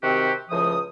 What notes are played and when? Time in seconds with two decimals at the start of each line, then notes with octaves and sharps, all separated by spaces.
0.02 C3 D#3 C4 F#4 G4
0.50 C#2 A2 F3 D#6